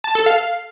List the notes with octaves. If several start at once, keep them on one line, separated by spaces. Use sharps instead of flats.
A5
A4
F5